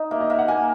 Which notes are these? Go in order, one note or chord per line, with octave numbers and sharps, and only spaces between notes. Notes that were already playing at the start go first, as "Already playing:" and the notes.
Already playing: D#4
A#3 E5
D#5
A#3 E5
F#5
A#3 G#5